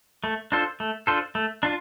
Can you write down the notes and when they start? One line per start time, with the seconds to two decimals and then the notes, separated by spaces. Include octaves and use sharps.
0.24 A3
0.52 D4 F4 A4 C5
0.80 A3
1.07 D4 F4 A4 C5
1.35 A3
1.63 D4 F4